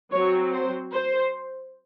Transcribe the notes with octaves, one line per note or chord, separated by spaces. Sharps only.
F#3 C4 C#5
C5
C5